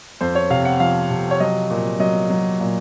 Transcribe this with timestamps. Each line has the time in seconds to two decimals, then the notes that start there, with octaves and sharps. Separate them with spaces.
0.21 F2 C5
0.35 C#5
0.50 C3 F5
0.65 F#5
0.80 F3 F5
1.10 C3
1.31 C#5
1.40 F#3 D#5
1.70 A#2
2.00 F#3 D#5
2.30 F#3
2.60 A#2